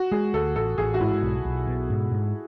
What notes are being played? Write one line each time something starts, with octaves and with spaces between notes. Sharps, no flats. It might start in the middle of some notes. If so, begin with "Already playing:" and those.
Already playing: F#4
G#3 G#4
D2 A4
A1 A4
A1 G#4
F#4
G#2 E4
B1
B1
B2
G#2
G#2